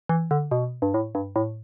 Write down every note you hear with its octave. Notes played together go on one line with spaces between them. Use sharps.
E3
D3
B2
G2
A2
G2
A2